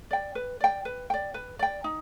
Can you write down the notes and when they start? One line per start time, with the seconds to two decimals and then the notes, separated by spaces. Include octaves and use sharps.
0.11 D5 G5
0.35 B4
0.60 D5 G5
0.85 B4
1.10 D5 G5
1.34 B4
1.59 D5 G5
1.84 D#4